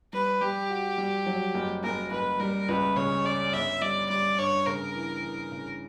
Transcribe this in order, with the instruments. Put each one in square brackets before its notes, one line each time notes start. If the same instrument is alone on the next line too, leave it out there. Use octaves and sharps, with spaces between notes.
[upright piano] G3 [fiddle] B4
[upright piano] G3 [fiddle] G4
[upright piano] F#4
G3
F#3
F#1
[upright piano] F#1 [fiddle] A#4
[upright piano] F#1 [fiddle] B4
[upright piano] G3 [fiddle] A#4
[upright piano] C#2 [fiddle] B4
[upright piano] C#3 [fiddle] C#5
[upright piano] C#4 [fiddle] D5
[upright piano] G1 [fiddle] E5
[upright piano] G3 [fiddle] D5
[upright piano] G3 [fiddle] D5
[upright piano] G2 [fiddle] C#5
[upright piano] C#3 [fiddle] A#4
[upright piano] E3
E3
C#3